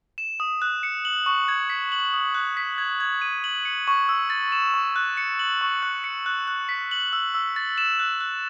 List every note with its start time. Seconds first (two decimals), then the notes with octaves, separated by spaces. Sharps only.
0.18 E7
0.40 D#6
0.62 F#6
0.83 C#7
1.05 F#7
1.26 C#6
1.48 G#6
1.70 B6
1.92 F#7
2.14 D#6
2.35 F#6
2.57 B6
2.78 G#6
3.00 G#6
3.22 D#7
3.44 F#7
3.65 C#7
3.88 C#6
4.09 E6
4.30 A6
4.52 E7
4.74 C#6
4.96 F#6
5.17 C#7
5.39 F#7
5.61 C#6
5.83 F#6
6.04 C#7
6.26 F#6
6.48 F#6
6.69 B6
6.91 F#7
7.13 E6
7.34 E6
7.56 A6
7.78 E7
7.99 F#6
8.21 F#6